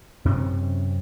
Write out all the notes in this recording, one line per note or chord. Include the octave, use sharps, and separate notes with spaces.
F#2 C3 C4 C#4